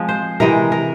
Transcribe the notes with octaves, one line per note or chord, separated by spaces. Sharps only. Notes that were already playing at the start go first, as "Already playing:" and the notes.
Already playing: F3 G#3 C4
C5
C3 E3 G#3 A#4
A#4